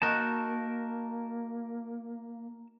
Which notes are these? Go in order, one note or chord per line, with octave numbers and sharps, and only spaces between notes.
A#3 D#4 F#4 A#4 A5